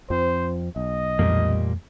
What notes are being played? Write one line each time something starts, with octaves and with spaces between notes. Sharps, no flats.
F2 F3 C4 C5
B1 D#5
F2 A#2 E3 G3 A3 A#3